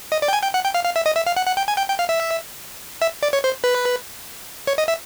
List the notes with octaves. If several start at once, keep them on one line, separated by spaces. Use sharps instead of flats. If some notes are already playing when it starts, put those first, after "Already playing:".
D#5
D5
G5
G#5
G5
F#5
G5
F5
F5
E5
D#5
E5
F5
F#5
F#5
G5
G#5
G5
G5
F5
E5
E5
D5
C#5
C5
B4
C#5
D#5
E5